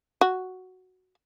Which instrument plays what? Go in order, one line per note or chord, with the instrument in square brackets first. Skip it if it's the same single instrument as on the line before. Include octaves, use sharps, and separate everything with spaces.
[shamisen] F#4